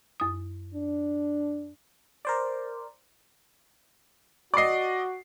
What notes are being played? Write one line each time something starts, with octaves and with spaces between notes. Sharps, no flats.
F#2 D#6
D4
A#4 C5 D5
F#4 D5 D#5 D6 C7